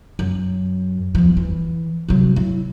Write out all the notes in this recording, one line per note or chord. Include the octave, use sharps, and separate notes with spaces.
F#2
E2 F3
E3
C2 F#3
E4